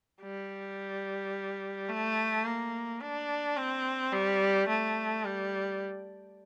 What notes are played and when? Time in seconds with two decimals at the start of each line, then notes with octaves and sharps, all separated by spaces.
0.22 G3
1.89 A3
2.45 A#3
3.01 D4
3.57 C4
4.13 G3
4.68 A3
5.24 G3